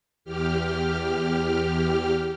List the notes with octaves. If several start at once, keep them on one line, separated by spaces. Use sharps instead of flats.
E2 G4 F6